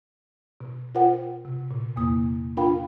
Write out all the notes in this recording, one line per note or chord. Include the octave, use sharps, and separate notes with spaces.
B2
F4 A#4 C5 F#5 G5
C3
A#2
E2 C3 A#3 D#6
D4 F4 A#4 F5 G5 B5